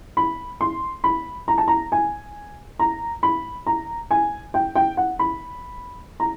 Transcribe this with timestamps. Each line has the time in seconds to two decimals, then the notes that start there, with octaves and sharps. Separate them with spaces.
0.17 B5
0.61 C6
1.04 B5
1.48 A#5
1.58 A5
1.68 A#5
1.92 G#5
2.79 A#5
3.23 B5
3.67 A#5
4.11 G#5
4.54 G5
4.75 G5
4.97 F#5
5.19 B5
6.20 A#5